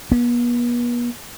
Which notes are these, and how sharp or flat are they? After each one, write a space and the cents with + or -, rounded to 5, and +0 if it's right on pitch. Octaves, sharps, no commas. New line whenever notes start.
B3 -40